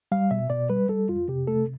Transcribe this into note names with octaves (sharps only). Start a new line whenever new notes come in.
G3 F5
B2 E5
B2 D5
G3 B4
G3 A4
F2 F4
C3 G4
A3 A4